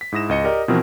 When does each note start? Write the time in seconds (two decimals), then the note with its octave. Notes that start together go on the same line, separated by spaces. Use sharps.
0.01 B6
0.12 G#2 E4 D#6 A#6 E7
0.29 C#2 D#5 C#7
0.44 G4 A#4 D5 D#5
0.68 B2 E3 F3 C4 F#4 A#4